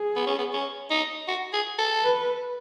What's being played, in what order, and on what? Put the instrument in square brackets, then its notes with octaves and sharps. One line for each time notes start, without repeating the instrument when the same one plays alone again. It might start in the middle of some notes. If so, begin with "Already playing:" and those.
Already playing: [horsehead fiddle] G#4
[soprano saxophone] B3
C#4
B3
C#4
D#4
F#4
G#4
A4
[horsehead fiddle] B4